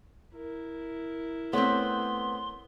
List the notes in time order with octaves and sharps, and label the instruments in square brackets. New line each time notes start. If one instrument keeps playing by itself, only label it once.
[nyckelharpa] E4 A#4
[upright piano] A3 C#5 [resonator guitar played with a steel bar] B3 C4 [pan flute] C6